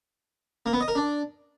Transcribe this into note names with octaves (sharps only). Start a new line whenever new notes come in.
A#3
B3
D#5
A#4
D4